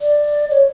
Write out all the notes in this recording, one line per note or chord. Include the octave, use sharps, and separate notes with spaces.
D5
C#5